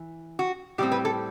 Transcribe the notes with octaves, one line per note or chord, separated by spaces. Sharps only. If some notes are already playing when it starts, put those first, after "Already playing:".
Already playing: E3
F#4
A2 G3 C4 G4
B4
A4